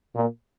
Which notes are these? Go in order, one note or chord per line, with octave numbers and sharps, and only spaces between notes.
A#2